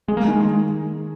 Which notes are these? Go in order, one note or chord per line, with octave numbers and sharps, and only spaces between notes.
G#3 G#4
A#3
D#3 G#3
G#3